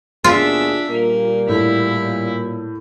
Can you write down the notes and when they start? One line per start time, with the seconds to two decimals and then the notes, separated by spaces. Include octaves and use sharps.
0.24 D#2 B2 D4 F4 G#4 E5
0.90 A#2 G3 A#3
1.48 A2 E4